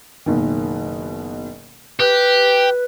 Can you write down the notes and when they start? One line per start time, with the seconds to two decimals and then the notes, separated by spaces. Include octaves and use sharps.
0.26 F#1 B2 D#3
2.00 G4 B4 F#6